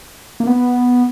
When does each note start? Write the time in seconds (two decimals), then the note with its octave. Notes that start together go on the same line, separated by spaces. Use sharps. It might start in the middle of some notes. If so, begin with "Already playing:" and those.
0.40 A#3
0.47 B3